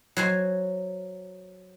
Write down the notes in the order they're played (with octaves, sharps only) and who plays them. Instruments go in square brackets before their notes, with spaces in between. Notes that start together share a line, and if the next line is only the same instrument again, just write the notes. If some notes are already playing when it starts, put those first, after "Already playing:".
[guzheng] F#3 C5 G#5